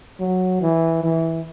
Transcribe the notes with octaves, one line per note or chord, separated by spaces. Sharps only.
F#3
E3
E3